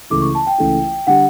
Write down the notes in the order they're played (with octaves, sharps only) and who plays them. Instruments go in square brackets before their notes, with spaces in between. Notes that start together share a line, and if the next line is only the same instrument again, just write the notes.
[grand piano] C#2 C#3 E3 A3 E4 [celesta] D6
[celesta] C#6
A5
G5
[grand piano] C#2 C#3 E3 A3 E4
[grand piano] D3 G3 [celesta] F#5